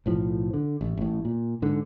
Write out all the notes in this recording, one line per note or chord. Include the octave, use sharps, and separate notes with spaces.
B1 A2 F3
D3
A1
A1 A2
A#2
G#2 D3